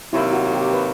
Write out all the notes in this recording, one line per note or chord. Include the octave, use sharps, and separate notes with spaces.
C3 D#3 F#3 A#3 E4
F#4
G4
B4